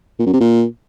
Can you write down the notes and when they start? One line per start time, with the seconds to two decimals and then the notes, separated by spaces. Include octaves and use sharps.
0.19 A#2
0.26 F#2
0.33 C3
0.40 A#2